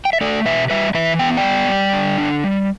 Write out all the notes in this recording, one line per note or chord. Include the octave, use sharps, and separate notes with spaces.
G5
E5
A3 A4 D5
B2 B4 E5
G3 B4 E5
E3 B4 E5
B3 G5
D5 G5
G3
G3
D3
D4
G3